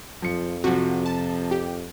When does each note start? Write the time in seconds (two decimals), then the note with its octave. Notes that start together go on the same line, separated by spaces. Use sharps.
0.22 F2 F3 C#7
0.64 C3 F3 F#4
1.06 A5
1.51 G4